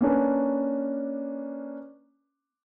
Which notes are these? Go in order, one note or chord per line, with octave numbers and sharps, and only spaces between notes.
A#3 C#4 D4 B4